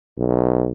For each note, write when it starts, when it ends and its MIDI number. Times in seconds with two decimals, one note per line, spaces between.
0.18 0.72 35